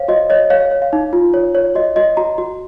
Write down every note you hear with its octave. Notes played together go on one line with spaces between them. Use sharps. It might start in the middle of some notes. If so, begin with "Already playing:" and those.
Already playing: C5 C#5 F5
F#4 D#5
C#5 D#5
C#5 F5
C#5
F5
D#4
F4
C#5
C#5
F#4 D#5
F#4 D#5
F#4 A#5
F#4